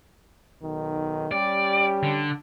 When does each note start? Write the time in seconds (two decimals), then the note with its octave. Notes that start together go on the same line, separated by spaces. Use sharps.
0.62 B1 D#3
1.31 G3 C#4 G4 D5
2.03 D3